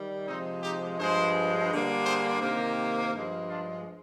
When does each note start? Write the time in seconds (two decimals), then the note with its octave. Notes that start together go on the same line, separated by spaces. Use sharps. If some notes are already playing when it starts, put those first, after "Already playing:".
Already playing: D#3 G3
0.28 C3 F3 G#3 C4 D#4
0.63 D#4 G4
0.99 G2 F3 G#3 G#4 C5
1.71 D3 G3 A#3
2.05 G#4 C5
2.41 C3 D#3 A#3 G4 A#4
3.13 G2 F3 G#3
3.49 D4 F4